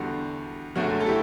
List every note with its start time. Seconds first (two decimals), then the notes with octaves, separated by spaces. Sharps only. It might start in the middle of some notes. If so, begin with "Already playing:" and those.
Already playing: E2 D3 G3 F#4
0.76 F#1 F#2 D3 F#3 A3 F#4
1.00 A4
1.06 E4 G4